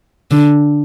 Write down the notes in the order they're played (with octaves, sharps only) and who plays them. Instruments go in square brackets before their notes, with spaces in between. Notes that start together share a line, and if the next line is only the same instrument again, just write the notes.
[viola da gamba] D3